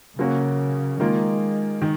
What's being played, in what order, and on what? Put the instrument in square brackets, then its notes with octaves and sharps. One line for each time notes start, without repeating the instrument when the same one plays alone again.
[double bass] C#3 [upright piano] F#3 A#3 C#4 F#4
[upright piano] D#3 A#3 F4 [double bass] G#3
[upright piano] D#3